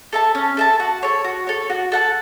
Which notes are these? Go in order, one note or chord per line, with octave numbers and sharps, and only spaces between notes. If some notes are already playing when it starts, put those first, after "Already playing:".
A4 E5 A5
C#4
A4 E5 A5
F#4
A4 C#5
F#4
A4 C#5
F#4
A4 F#5 A5